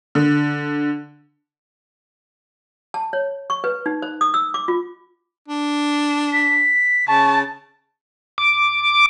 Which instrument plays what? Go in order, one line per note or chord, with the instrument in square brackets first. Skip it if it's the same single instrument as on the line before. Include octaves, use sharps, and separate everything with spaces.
[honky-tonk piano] D3
[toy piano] A5
C#5
C#6
B4
D#4
C5
D#6
E6
D6
F4
[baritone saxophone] D4
[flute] B6
[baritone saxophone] C#3 [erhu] A5 [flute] C#6
[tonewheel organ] D6